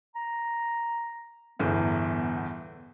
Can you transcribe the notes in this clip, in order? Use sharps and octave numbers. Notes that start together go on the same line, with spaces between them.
A#5
G1 E2 A2 B3